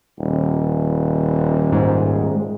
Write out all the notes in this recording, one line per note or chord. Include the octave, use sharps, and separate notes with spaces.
D#1
G#2